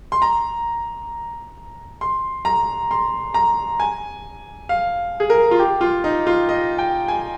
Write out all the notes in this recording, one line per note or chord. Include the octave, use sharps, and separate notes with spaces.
C6
A#5
C6
A#5
C6
A#5
G#5
F5
G#4
A#4
F4
G4
F4
D#4
F4
D#5
G5
G#5